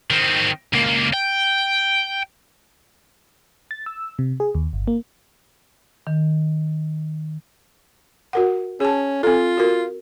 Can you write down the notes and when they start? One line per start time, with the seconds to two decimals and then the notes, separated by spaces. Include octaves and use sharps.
0.11 D#3 C4
0.73 C#2 A#3
1.14 G5
3.71 A6
3.86 E6
4.19 C3
4.40 G#4
4.55 D#2
4.73 G1
4.88 A#3
6.07 D#3
8.33 F#4 A#4 F#5
8.80 C#4 G#4 A5
9.23 C4 F4 A4
9.57 F#4 A#4